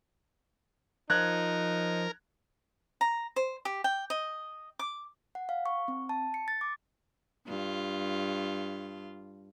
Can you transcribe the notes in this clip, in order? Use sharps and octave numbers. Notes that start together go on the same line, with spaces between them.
F3 D#4 A#4 F#6 G#6
A#5
C5
G4
G5
D#5
D6
F#5
F5
C#6
C4
A5
C#7
A6
D6
G2 F4